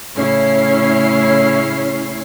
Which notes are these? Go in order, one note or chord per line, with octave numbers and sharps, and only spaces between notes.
A2 C#3 C#4 E4 C#5 C7